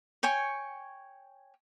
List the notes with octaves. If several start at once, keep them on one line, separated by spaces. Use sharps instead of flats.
C#5 G5 G#5 C#6